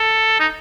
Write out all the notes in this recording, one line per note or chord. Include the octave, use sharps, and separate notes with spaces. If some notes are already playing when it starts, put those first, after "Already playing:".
Already playing: A4
D#4